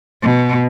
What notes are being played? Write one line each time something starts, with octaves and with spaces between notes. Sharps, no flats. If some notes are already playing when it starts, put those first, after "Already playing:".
B2